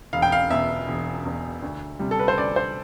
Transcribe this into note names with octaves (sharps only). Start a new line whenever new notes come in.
E1 F5
G5
F5
E2 B2 E5
E1
E2 B2
D2
C3 G3
A4
B4
C5
D2 D5
C5